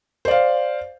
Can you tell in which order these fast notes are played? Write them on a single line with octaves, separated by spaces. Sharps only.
C5 D5 F5